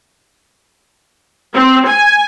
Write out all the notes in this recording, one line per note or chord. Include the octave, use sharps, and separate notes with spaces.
C4
G#5